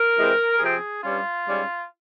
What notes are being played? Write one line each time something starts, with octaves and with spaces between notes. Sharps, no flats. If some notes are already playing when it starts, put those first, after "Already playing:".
Already playing: A#4
C3 E3 G#3 C4
C3 F3 C4 G#4
G2 G3 C#4 F4
G#2 G3 C#4